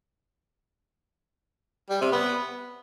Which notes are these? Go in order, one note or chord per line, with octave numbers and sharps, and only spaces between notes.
G3
C3
B3